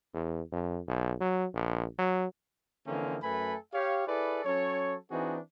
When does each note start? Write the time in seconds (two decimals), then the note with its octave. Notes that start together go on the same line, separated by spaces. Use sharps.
0.14 E2
0.52 F2
0.88 B1
1.21 F#3
1.54 A#1
1.98 F#3
2.87 D3 E3 F3 A#3 C4 C#4
3.23 F#2 A3 A4 B4 G#5 B5
3.74 G4 C#5 F5
4.08 E4 G#4 A4 B4 D5
4.45 F#3 C#4 A4 C#5
5.11 E3 C4 D4 D#4 F#4 G#4